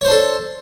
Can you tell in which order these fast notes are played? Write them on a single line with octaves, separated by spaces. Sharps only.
C#5 C5 D4 A4